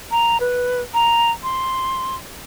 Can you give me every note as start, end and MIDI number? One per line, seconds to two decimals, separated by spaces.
0.11 0.38 82
0.40 0.81 71
0.94 1.31 82
1.43 2.15 84